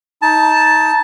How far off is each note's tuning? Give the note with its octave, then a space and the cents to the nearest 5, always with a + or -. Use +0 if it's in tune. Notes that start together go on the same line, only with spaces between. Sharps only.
D#4 +20 A5 +0